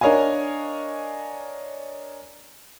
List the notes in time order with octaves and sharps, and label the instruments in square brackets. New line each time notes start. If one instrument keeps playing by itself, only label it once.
[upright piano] D4 A#4 C#5 D#5 F5 G#5